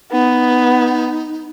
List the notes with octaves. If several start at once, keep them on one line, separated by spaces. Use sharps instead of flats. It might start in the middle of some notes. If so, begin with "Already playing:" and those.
B3 D#4